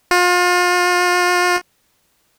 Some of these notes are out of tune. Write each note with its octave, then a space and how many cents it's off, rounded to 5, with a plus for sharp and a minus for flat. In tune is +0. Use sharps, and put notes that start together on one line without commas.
F4 +35